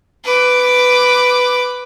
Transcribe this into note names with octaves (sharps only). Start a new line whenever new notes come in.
B4 D6